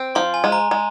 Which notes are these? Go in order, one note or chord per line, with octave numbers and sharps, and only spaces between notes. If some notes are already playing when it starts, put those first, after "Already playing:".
Already playing: C4
F3 C6
G#5
G#3
A#5
G#3